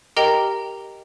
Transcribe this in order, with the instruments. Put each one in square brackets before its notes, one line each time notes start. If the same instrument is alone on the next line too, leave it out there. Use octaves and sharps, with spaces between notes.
[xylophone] G4 A#4 D#5 G5 A#5